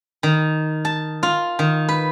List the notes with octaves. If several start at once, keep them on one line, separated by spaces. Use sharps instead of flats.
D#3
A5
F4
D#3
B4